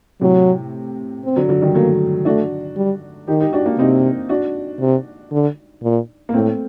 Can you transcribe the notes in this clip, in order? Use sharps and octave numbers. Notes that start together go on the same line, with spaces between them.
A2 C3 F#3
C4
D3 F#3
D3 F#3
D#3 G3
F#3 A3 A#3
A3 D4 F#4
G3
D#3 D#4 G4
D#4 G4
D4 F#4
A#3 D4
C3 C4 D#4
D4 F#4
C3
D3
A#2
A#3
A2 A3 C4